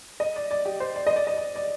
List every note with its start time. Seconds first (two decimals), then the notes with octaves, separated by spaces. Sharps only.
0.20 D#5
0.36 D5
0.51 D5
0.65 G4
0.80 C5
0.96 D5
1.07 D#5
1.16 D5
1.27 D#5
1.37 D5
1.55 D5